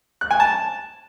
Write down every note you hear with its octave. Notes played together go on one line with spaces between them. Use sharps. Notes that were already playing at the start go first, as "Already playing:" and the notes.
F#6
G#5
A5